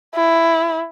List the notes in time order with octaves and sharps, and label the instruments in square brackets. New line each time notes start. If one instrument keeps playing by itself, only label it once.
[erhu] E4